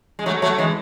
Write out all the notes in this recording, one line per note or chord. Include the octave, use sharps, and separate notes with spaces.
G#3
F#3 A3
F#3 A3
E3 G#3